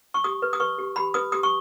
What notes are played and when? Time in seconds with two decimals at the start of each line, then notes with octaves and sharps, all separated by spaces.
0.14 C#6
0.24 G4 D#6
0.42 B4
0.53 D#6
0.60 B4 C#6
0.78 G4
0.96 G4 B5
1.14 B4 D#6
1.32 G4 D#6
1.43 C#6